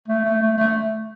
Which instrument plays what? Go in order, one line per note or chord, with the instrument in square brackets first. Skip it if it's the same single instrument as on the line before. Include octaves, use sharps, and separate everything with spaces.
[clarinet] A3
A3
A3
A3